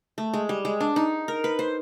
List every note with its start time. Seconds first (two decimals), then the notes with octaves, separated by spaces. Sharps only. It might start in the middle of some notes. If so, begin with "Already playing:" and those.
0.18 A3
0.34 G#3
0.49 G3
0.65 G#3
0.81 D4
0.96 D#4
1.28 A#4
1.44 B4
1.59 C5